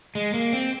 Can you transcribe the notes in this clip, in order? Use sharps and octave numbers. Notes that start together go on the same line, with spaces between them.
G#3
A#3
C4